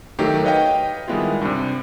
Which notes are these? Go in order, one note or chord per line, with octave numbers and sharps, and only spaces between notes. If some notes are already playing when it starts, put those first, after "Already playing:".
D#3 F#3 A3 D#4 G4
B4 C#5 D#5 F5 G5
D#3 G3 G#3 B3 E4 F4
G2 C3